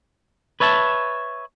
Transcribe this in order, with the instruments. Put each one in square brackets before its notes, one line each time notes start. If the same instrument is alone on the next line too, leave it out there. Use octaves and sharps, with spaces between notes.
[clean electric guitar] B4 C#5 E5 A5